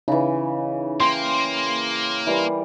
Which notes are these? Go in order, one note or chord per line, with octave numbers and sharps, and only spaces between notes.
C#3 E3 D#4
A#3 G5 C6
E3 G3 A#4